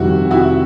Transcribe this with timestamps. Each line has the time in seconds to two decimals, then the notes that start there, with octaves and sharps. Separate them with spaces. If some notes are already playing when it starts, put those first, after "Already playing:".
Already playing: F1 F2 C3 D#3 G3 E4 F#4
0.31 E4 F#4